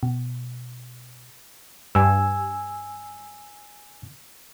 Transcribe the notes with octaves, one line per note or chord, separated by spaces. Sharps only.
B2
G2 G#5 E6